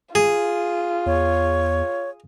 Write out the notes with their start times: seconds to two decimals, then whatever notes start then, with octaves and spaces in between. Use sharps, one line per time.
0.15 F4 G#4
1.06 E2 C#5